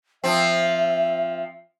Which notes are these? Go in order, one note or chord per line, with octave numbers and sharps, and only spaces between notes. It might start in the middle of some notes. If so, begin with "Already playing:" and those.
F3 C4 E5